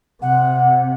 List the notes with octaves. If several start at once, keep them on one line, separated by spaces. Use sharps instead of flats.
C3 F#5